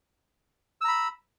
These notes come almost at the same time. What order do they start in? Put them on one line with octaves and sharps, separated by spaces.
E6 A#5 B5